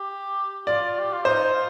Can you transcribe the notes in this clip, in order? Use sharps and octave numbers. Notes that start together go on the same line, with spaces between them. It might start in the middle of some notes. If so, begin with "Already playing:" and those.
Already playing: G4
F4 D5
G4
F4
D#4 C5
F4